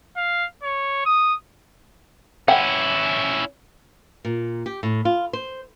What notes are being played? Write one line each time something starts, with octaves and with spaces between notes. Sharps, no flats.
F5
C#5
D#6
C#4 E4 F#5 G5
A#2
G4
A2
F4
C5